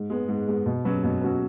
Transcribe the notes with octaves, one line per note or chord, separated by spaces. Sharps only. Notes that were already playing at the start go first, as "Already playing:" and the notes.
Already playing: G#2
G#3 B3
G#2
G#3 B3
B2
F#3 C#4 F#4 B4
B2
F#3 C#4 F#4 B4